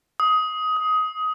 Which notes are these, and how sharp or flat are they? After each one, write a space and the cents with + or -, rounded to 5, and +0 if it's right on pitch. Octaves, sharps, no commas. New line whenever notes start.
D#6 +15
D#6 +20